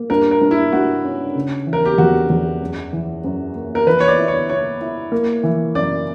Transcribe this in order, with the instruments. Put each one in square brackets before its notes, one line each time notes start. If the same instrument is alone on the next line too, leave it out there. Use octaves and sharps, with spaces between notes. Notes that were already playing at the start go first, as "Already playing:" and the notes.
Already playing: [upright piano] A#3
[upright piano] G2 [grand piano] A#4
[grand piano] A#4
[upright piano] G2
[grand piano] E4
[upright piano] G2 [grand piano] F#4
[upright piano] C#4
C#3
E3
[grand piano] A#4
G4
[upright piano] E2 [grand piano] F#4
[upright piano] E2
F#2
E3
F#2
A#3
[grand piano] A#4
[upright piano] E3 [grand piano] B4
[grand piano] C#5
D5
[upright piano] E4
[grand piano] C#5
[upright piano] E4 [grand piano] C#5
[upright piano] E4
A#3
E3
[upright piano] F#2 [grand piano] D5